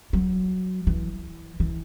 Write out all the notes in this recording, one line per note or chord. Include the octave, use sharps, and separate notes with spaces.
F#3
E3
E3